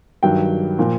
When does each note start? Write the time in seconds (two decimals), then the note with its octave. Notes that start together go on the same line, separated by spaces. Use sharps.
0.23 G2 D#3 F#3 G5
0.79 A#2 F3